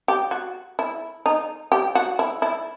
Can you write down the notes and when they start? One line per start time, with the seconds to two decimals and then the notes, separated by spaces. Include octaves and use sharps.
0.08 G4
0.31 F#4
0.79 E4
1.26 D#4
1.72 G4
1.95 F#4
2.19 E4
2.42 E4